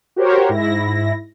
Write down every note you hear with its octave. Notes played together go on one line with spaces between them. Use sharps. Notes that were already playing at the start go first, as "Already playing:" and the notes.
F#4 G4 A#4 C5 C#5
G#2 E4 A#6